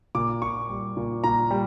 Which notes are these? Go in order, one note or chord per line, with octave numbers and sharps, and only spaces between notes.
A#2 D6
A#2 C#6
G3
A#2
A#2 A#5
G3